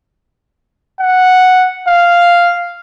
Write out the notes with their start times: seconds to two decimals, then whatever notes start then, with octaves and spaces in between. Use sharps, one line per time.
1.00 F#5
1.88 F5